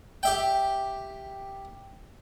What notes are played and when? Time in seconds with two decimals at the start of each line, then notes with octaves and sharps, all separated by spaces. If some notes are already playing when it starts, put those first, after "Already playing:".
0.23 G4 E5 G5